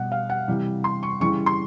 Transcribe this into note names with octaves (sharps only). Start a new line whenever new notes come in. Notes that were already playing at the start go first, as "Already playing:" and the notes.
Already playing: B2 G3 F#5
F5
F#5
C3 E3 G3
C6
C#6
C#3 E3 G3 C#6
C6